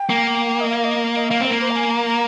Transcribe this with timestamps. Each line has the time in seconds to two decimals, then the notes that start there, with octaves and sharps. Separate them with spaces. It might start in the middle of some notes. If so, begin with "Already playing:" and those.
Already playing: G5
0.10 A#3
0.60 D#5
0.70 F5
0.84 D#5
1.16 D#5
1.30 A#3 F5
1.41 C4 A#4
1.51 A#3
1.60 C5
1.71 A#5
1.76 G#5
1.91 A#5
2.06 A#5